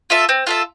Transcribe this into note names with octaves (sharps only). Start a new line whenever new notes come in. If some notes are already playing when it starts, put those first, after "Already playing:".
F4 A4 E5
C4
F4 A4 E5